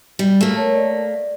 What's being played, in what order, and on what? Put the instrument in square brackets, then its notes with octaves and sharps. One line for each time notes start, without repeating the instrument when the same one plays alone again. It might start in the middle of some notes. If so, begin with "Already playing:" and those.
[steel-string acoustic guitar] G3
A3 A#3
[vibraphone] A#4 C#5 A5
D5